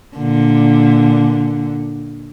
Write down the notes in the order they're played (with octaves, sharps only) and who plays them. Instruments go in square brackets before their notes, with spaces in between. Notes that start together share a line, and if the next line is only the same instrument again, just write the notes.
[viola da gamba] A#2 D3